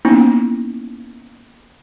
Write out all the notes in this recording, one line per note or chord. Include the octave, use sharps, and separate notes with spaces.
A#3 B3 C#4 D#4 E4